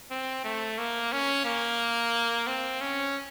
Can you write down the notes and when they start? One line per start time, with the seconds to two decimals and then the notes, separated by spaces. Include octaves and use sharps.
0.11 C4
0.44 A3
0.78 A#3
1.12 C#4
1.45 A#3
2.47 C4
2.81 C#4